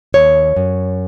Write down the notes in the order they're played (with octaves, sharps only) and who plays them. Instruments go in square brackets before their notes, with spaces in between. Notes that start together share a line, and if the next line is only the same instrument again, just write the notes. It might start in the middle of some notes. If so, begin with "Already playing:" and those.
[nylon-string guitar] D#2 C#5
F#2